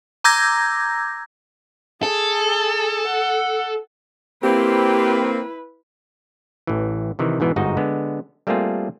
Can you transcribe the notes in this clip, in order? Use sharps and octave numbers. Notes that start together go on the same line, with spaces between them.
A#5 D6 E6 G6 G#6 A#6
G#4 A4
F#5
A#3 C4 E4 G4 B4
A1 E3
C3 D#3 E3
G#2 B2 E3 B3
G1 G#2 D#4 F#4 D#5
D3 G#3 B3
G3 A3 A#3 C4 F4 G#4